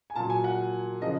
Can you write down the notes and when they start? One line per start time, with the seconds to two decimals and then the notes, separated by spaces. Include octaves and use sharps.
0.10 G#5
0.15 A#2 F#3 A5
0.30 G#5
0.44 F#5
1.02 C#3 F3 D#5